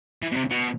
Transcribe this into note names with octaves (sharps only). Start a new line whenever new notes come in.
E3
B2
C3
B2